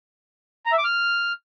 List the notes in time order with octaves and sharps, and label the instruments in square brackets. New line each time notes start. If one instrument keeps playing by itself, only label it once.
[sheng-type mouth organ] A#5
E5
D6
F6